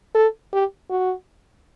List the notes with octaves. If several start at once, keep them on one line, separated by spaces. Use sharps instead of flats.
A4
G4
F#4